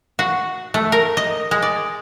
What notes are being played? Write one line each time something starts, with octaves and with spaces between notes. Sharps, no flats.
F#4
A3
A#4
D#5
G#3
D5